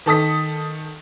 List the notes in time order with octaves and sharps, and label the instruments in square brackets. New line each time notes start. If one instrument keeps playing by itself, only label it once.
[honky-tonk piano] D#3 A4 D#6 B6